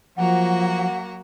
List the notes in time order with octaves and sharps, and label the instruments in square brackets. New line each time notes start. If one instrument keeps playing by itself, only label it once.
[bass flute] F3 [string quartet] F#3 A#3 F#4 [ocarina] F#5